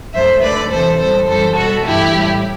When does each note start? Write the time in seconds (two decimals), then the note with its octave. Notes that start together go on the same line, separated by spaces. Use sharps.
0.14 F#2 F#3 A3 C5 E5
0.42 D2 D3 A3 B4 D5
0.71 E2 C3 E3 A4 C5
0.99 A2 G3 A4 C5
1.27 F#2 E3 G3 A4 C5
1.56 B2 G3 F#4 A4
1.84 G2 E3 A3 E4 G4
2.13 A2 G3